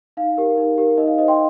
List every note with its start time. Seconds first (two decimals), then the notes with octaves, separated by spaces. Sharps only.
0.17 D#4 F5
0.37 G4 A#4
0.57 D#4
0.78 G4 A#4
0.97 D#4 D#5
1.08 F5
1.18 C5 D#5
1.28 G5 C6